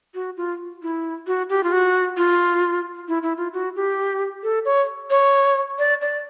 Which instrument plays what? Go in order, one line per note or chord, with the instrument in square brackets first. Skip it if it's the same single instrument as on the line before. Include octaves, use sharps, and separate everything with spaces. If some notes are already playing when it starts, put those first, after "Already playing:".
[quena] F#4
F4
E4
F#4
G4
F4
F#4
F4
E4
E4
F4
F#4
G4
A4
C#5
C#5
D5
D5